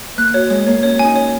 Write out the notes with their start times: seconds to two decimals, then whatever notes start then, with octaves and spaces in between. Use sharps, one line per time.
0.18 A#3 F#6
0.34 F#4 C#5
0.50 G#3 C#5
0.67 A#3 C#5
0.83 C#4 C#5
0.99 C#4 D#4 G#5
1.16 C#5